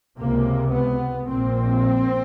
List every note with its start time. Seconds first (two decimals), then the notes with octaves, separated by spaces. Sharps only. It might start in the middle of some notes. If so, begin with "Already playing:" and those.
0.17 C#2 C3 A#3
0.72 B3
1.27 A#1 A#2 C4